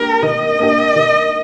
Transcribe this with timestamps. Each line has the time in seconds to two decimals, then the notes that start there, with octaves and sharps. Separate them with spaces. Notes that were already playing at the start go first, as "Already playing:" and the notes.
Already playing: D#3 A#3 D4 G4 A#4
0.22 D#3 D#5
0.59 A#3 D4 G4
0.96 D#3